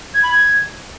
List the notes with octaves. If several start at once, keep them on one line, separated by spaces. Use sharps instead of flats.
G#6
B5
G#6